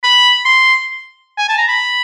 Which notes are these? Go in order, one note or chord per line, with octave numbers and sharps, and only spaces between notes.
B5
C6
G#5
A5
A#5
B5